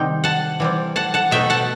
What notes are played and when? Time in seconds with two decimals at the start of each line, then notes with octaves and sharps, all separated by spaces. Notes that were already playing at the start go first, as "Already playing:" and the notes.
Already playing: C3 D#3 G3 C4 D#4 G5
0.24 F#5 A5
0.60 E3 G3 C4
0.96 F#5 A5
1.14 F#5 A5
1.31 B2 A3 D#4 E5 G5
1.50 F#5 A5